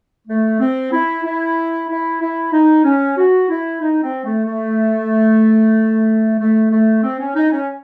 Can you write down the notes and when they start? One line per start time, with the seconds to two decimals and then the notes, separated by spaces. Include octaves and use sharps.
0.28 A3
0.60 C4
0.92 E4
1.24 E4
1.89 E4
2.21 E4
2.53 D#4
2.85 C#4
3.17 F#4
3.49 E4
3.81 D#4
4.03 C4
4.25 A3
4.46 A3
6.39 A3
6.72 A3
7.03 C4
7.20 C#4
7.36 D#4
7.52 C#4